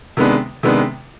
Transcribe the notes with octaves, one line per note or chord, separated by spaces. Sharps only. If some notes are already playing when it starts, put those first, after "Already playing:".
C3 D#3 G#3 B3 D4
C3 D#3 G#3 B3 D4